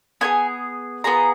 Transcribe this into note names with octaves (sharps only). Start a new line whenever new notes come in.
B3 F4 G#4 G#5
B3 F4 G#4 A#5